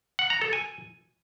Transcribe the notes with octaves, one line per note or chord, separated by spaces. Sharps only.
F#5
A#5
A4
G#5